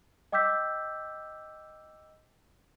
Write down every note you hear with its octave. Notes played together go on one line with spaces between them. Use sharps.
D#5 G5 D6 E6 G6 B6